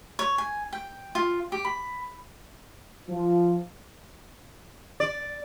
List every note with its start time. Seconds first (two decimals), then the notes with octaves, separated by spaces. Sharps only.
0.19 C#5
0.38 G#5
0.73 G5
1.15 F4
1.52 G4
1.65 B5
3.09 F3
5.00 D5